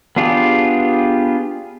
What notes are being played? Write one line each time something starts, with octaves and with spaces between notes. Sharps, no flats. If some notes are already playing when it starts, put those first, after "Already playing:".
B3 D4 F4 G4 G#4